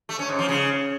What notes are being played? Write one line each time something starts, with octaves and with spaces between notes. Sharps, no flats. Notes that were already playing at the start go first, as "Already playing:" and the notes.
A3
C#4
G#2
F3
C#3